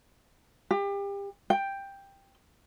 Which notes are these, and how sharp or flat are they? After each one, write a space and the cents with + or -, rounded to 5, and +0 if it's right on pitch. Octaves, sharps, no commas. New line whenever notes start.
G4 +30
G5 +5